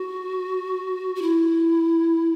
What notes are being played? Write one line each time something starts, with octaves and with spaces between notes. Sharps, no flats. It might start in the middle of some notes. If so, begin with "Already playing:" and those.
Already playing: F#4
F#4
E4